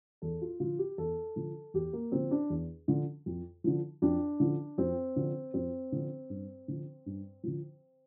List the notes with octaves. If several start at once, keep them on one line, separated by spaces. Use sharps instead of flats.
E2 A4
F4
D3 F3 F4
G4
E2 A4
D3 F3
E2 G4
A#3
D3 F3 C4
D4
E2
D3 F3
F2
D3 F3
F2 D4
D3 F3
F2 C4
D3 F3
F2 C4
D3 F3
G2
D3 F3
G2
D3 F3